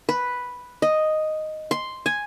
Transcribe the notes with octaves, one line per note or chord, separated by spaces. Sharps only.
B4
D#5
C6
G#5